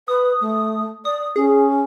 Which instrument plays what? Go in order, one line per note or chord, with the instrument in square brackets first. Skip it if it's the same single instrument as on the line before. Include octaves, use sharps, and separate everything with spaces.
[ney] B4 [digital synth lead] D#6
[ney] A3
[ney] D5 [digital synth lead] D#6
[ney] C#4 [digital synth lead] G#4